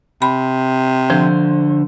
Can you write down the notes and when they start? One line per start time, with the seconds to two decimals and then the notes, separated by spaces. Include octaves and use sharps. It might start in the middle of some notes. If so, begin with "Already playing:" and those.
0.22 C3 B5
1.10 D3 F3 C5